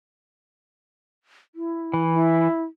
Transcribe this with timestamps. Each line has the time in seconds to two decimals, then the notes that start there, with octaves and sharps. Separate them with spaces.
1.55 E4
1.94 E3
2.13 E4